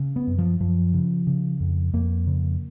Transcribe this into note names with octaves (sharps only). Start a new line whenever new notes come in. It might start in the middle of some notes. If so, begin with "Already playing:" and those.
Already playing: C#3
B3
F#2
F3
F#2 F3
C#3
C#3
F2
F2 A#3
C#3